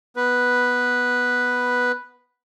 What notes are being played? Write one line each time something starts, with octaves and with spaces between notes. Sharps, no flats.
B3 B4